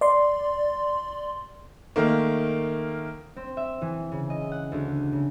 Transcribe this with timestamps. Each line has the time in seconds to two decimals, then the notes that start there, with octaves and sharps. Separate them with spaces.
0.01 D5 C6
1.96 D#3 A3 A#3
3.36 C4
3.57 E5
3.82 E3
4.12 C#3
4.30 D#5
4.52 F#5
4.72 D2
5.12 C#3